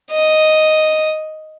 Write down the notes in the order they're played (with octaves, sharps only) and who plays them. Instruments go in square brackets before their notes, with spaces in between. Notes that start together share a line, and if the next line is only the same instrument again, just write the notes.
[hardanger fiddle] D#5